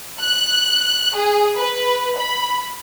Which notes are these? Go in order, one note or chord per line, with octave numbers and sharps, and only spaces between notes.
F#6
G#4
B4
B5